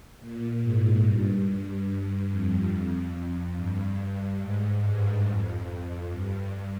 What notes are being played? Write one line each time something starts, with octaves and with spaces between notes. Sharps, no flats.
A#2
G#2
G2
G2
F2
F2
F2
G2
G#2
G2
F2
G2